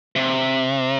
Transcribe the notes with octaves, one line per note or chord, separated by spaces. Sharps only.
C3